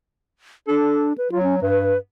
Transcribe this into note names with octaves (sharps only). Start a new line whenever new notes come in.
D4 A4
B4
F#3 F4
C#4
G2 B4